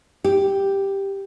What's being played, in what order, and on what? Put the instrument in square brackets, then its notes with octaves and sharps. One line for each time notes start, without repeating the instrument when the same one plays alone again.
[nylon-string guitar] G4